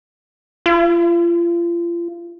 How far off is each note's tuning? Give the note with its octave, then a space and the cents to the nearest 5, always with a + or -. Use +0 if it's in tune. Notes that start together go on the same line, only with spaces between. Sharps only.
F4 -35